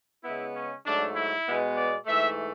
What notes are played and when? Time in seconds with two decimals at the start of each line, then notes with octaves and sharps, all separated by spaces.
0.24 C#3 G#3 B3 E4
0.55 C#4
0.84 G#2 F#3 A3 D4
1.15 E4
1.46 B2 G#3 B3
1.76 D5
2.06 G#2 E3 A3 E5